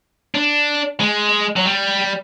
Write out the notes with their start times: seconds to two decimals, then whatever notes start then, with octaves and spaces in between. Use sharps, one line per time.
0.35 D4
1.00 G#3
1.56 F#3
1.66 G3